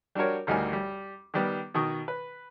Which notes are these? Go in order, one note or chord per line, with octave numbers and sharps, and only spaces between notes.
G3 D4 F#4 A#4 C#5
A1 D2 G3 D#4 A#4 G#5
G3
D#3 G3 B3
B2 D#3 C#6 D#6
B4